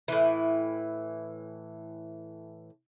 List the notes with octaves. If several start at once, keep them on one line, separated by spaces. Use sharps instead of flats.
A2 E3